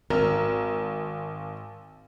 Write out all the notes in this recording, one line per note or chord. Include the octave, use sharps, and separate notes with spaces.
G#1 A#4